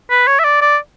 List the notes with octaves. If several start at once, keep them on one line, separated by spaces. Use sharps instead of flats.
B4
C#5
E5
D5
D5